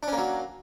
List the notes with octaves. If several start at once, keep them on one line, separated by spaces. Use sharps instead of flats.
F#3 A#3 C#4 D4